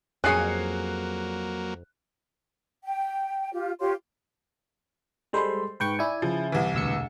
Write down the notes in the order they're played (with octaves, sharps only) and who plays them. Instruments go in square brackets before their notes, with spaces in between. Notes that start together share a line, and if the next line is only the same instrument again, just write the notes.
[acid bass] F2 [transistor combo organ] F#3 A#3 [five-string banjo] C#4 G#4 [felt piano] F#6 C7 C#7
[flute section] G5
F4 G4
F4 G4 C#5 C6
[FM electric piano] G3 G#3 C5 [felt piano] A4 B5 C6
[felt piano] G#2 [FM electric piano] B4 G5 C#6
[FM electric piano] E4 G#5 [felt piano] D5
[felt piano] C#3 [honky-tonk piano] F3
[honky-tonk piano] C2 E3
[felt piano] E1 [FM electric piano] D2 E6 C#7